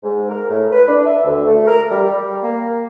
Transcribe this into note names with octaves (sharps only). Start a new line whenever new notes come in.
G#2
A#4
A2
B4
D4
E5
D2
A3
A#4
G3
G3
A#3